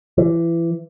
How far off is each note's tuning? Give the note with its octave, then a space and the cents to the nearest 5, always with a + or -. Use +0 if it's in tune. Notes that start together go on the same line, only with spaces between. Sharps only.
E3 +25